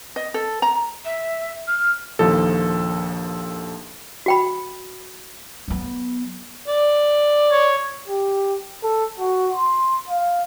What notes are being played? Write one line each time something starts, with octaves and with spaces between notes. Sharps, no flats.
D#5
A4
A#5
E5
F6
A#1 D#2 F3 A4
F#4 G5 B5
F#3 B3
D5
C#5
G4
A4
F#4
C6
F5